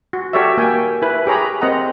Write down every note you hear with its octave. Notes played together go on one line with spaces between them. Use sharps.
F#4
F#4 G4 A4 C#5 D5 E5
A#3 G5 G#5
E4 B4
G4 G#4 C#5 A#5 B5
C4 A#4 D#5 F#5 A#5